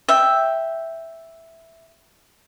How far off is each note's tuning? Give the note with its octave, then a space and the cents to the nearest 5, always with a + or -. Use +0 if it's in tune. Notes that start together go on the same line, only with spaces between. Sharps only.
E5 +0 G5 +0